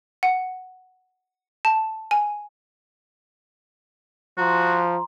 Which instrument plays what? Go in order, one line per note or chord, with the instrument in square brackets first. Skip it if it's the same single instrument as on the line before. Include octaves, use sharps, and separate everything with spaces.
[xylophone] F#5
A5
G#5
[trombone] F3 [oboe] F#4 [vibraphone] A#5 C6